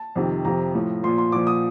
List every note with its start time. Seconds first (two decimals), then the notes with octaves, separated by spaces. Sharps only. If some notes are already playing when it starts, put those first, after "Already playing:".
Already playing: A5
0.16 F2 C3 D#3
0.45 F2 C3 F3 A#5
0.74 A2 F3
1.03 A#2 F3 C6
1.18 C6
1.32 A#2 F3 D6
1.47 D#6